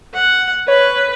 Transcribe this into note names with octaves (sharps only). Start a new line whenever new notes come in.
F#5
B4 C#5